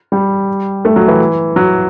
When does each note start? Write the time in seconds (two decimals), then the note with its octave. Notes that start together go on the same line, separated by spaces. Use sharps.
0.12 G3
0.85 A3
0.96 F#3
1.08 E3
1.56 F#3